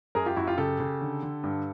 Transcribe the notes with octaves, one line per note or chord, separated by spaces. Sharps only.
F#2 G#4 A#4
F4 G4
F#2 E4 F#4
F4 G4
C#3 G4 A4
C#3
D3
D3
G2